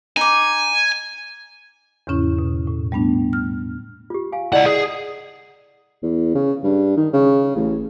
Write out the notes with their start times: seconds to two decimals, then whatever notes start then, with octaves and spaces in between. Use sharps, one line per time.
0.17 D#4 G#5 D6
2.07 E2 G#2 C#3 C#4 E4
2.39 B2
2.67 A2
2.92 G3 A3 B3 D4
3.33 F6
4.10 F4 G4
4.32 F5 G#5
4.53 C#2 E4 D5 D#5 F#5
4.66 G#4
6.03 E2
6.35 C#3
6.64 G2
6.97 D#3
7.13 C#3
7.56 A1